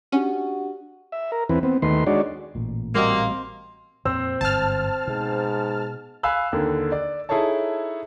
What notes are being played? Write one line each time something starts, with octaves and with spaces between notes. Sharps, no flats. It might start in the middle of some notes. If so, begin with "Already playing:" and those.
C#4 D4 F#4 G4
E5
A#4
E2 E3 C4 B4
B3 C4
D#2 D#3 A3 B4 C6
G#3 D4 D#4 F#4 C#5 D5
A1 A#2
G3 A#3 C4 F#4 C5 D#5
F2 A#2 C4 C5 E6
G1 G#2 A5 F6
G#2 B2
F5 G#5 B5 E6 F#6
D#2 D3 D#3
D5
D#4 E4 G#4 A4 C#5 A5